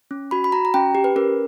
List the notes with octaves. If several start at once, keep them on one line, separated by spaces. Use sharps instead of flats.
C#4
F#4 B5
B5
F#4 A#5
A#5
C#4 G5
G4
B4
C#4 A#4